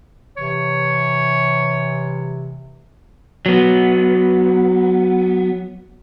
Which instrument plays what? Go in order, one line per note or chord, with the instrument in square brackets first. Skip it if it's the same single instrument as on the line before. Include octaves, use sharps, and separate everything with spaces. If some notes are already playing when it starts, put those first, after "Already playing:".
[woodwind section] C3 E3 [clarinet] C#5
[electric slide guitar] F#3 B3